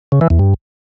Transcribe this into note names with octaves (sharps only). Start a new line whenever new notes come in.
C#3
E3
E2
G2